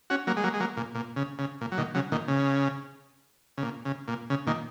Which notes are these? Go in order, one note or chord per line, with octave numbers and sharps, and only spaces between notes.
C#4 F#4
F#3 A#3
G#3
F#3 A#3
G#3
F#3 A#3
A#2
A#2
C#3
C#3
A#2
F#3
A#2 D#3
C#3 F#3
A#2 D#3
C#3
C#3
A#2
C#3
A#2
C#3
A#2 D#3